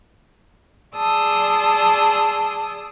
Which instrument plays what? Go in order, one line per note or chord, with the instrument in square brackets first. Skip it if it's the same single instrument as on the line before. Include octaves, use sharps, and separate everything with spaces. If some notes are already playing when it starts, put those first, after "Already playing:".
[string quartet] G#4 D5 A5 C6 D#6 E6